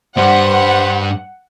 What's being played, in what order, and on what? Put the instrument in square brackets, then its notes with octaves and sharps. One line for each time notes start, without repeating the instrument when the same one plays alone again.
[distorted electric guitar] G2 G3 [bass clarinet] C5 [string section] F#5